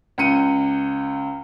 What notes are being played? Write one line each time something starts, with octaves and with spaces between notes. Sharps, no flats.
C#2 C#3 C#7 D#7